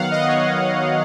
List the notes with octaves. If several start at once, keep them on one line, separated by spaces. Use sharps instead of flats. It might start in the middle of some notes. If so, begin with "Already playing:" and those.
Already playing: D#3 F#3 B3 F5 F#5
D#5
C#5